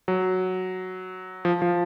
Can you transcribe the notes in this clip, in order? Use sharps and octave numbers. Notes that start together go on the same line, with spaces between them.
F#3
F3
F3